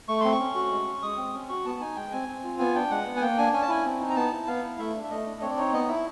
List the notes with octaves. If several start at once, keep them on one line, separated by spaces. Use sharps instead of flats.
A3 C#6
C4 C6
C#6
C#4
F#4
G#3
C#4
G#3 D#6
C4
C#4
F#4 C#6
B3 A5
D#4 G#5
G#3 G5
C4 G#5
C4
F4
B3 G#5
D4 G5
G#3 F#5
B3
G#5
A#3 G5
D4 G#5
C#4 G#5
A5
E4 G#5
C4
D#4
A#5
B3 A5
E4
B3 F5
E4
A3 E5
D4
E5
A3 D#5
D4
C4 C#5
D5
D#4 C#5
B3 D#5
E4 E5